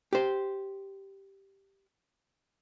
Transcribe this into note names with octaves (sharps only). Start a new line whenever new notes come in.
G4 C5